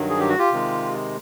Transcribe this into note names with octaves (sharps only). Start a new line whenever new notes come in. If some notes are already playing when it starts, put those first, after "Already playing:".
Already playing: G2 D#3 F#3
G#4
G4
F#4
F4 G4
C3 D#3 G#3